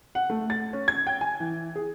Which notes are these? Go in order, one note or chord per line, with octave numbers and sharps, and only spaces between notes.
F#5
A3
A6
C#4
G#6
G5
G#5
E3
G#4